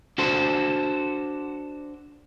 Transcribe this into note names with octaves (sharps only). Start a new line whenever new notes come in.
D4 F#4 A4 C5